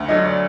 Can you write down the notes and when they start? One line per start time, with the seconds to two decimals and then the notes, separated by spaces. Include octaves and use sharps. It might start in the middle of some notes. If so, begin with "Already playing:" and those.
Already playing: D2
0.09 D3 F#3 D#5
0.25 D5